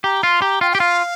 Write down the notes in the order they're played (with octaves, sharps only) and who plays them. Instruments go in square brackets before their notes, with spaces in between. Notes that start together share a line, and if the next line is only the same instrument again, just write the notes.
[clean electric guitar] G4 [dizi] A#5
[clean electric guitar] F4 [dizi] C6
[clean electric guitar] G4 [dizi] A#5
[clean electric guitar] F4 [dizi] G5
[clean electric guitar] G4 [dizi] G5
[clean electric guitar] F4 [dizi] F5